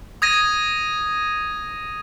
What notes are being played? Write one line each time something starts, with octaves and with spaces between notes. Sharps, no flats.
D#6 G#6 A#6 D#7